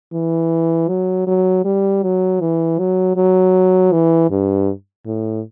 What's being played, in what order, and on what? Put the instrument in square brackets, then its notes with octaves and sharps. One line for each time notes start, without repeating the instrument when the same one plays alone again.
[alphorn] E3
F#3
F#3
G3
F#3
E3
F#3
F#3
E3
G2
A2